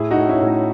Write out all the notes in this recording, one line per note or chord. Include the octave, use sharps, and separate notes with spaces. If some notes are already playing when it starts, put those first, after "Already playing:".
Already playing: A2 E4 G#4
D#4 F#4
A2
C#4 E4
A2
D#4